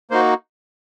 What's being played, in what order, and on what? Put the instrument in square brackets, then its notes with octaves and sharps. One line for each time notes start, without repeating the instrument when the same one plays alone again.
[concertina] A#3 D#4 F#4 C5